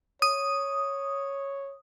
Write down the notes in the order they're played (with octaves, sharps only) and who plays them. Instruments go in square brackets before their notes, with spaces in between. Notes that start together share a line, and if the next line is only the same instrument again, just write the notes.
[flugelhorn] C#5 [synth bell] D#6